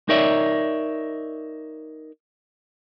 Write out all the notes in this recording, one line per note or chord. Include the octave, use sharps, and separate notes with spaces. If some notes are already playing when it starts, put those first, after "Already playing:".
D#4 A#4 C#5 D5 E5